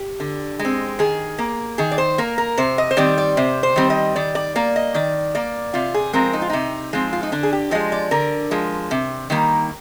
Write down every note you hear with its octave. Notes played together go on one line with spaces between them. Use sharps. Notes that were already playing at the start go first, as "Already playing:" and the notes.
Already playing: G4
D3
G#3
C4
D#3 G#4
A#3
D#3 G#4
D5
C5
A#3 A#4
A#4
C3 C5
D#5
C5
D#3 G3 C4 D5
D5
C3 C5
C5
D#3 G3 C4
D#5
D#3 D5
D5
A#3 D5
D#5
D#3 D5
A#3 D5
C3 F4
G#4
F3 G#3 C4 A#4
D#4
F4
C3 D#4
F3 G#3 C4
F4
D#4
D3 D4
G#4
G4
F3 G#3 D#5
D5
D3 A#4
F3 G#3
C3
D#3 G3 A#3